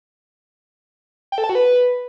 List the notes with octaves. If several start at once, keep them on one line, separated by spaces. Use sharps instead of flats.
G5
A4
A5
F#4
B4